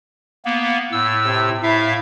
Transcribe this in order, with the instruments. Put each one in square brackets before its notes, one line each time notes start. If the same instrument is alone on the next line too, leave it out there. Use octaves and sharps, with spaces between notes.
[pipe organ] A#3 B3
A2 E6
[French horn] C3
[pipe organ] A2 E5 F5 [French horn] E4